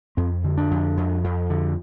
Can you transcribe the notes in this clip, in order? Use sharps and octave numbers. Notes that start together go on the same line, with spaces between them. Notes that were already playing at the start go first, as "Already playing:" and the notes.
F2 C4
D3
D4
F2
F2
F2
D3